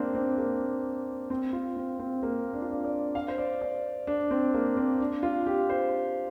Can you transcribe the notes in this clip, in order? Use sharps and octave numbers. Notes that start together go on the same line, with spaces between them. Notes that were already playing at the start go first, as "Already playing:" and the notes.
Already playing: A#3 C4 D4
C4
A#3
C4
F4
C4
C4
A#3
D4
F4
D4
D5
F5
C5
D5
D5
D4
C4
A#3
C4
D4
F4
G4
C5